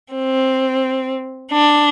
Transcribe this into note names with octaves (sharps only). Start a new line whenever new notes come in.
C4
D4